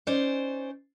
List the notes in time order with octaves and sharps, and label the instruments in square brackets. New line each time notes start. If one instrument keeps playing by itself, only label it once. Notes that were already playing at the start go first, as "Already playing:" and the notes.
[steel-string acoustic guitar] C#4 D#4 C5 D5